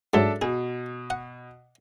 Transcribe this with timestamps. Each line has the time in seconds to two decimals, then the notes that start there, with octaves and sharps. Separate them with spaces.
0.14 G#2 F#3 D4 A4 E5
0.42 B2 G#4
1.10 F#5